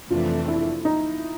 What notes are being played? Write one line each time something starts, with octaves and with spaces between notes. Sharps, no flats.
F2 C3 E3 A3 D4 F4
E4
D#4